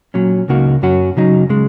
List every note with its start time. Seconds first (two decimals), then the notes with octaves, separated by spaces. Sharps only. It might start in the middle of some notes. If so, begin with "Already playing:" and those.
0.14 A#2 F#3 C#4
0.48 C#2 C#3 A#3 D#4 F#4
0.82 F#2 F#3 C#4 F#4
1.17 C#3 F#3 D#4
1.49 C#3 G#3